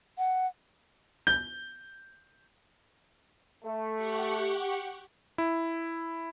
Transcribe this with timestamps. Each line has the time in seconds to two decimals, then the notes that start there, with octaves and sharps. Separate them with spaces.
0.18 F#5
1.27 G6
3.64 A3
3.95 G4 F#5 C#6
5.38 E4